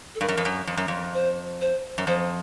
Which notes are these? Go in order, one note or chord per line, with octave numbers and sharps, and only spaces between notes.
A4
G2 A#4
F#2
F2
F#2
F2
F#2
F2
C5
C5
F#2
F2 C5